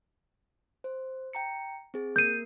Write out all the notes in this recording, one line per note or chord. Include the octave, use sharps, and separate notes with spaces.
C5
G5 A#5 C#7
C4 G#4
A#3 A#4 G6 C7 D#7